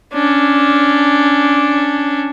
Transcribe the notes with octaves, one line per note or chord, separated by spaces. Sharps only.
C#4 D4